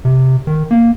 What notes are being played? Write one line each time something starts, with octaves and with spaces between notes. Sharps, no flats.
C3
D#3
A#3